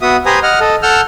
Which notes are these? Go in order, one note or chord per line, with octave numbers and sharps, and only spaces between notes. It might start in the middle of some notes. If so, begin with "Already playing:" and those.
B3 F#4 E5 D#6
G4 B4 C5 G#5 A#5 D#6
D#5 F#5 F6
A4 D#5
A4 F#5 E6 F6 G6